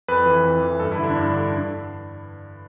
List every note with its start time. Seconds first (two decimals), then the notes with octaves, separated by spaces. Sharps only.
0.08 F2 B4
0.26 E3
0.44 F2
0.61 E3
0.80 G2 A4
0.92 E4
0.98 D3
1.04 D4
1.15 G2
1.33 D3
1.51 D4